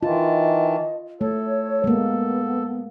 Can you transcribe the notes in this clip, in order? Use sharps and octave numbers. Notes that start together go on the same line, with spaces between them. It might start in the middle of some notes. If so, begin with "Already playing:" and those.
D#3 E3 F4 D#5 A5
A3 A4 C#5
G#3 A#3 B3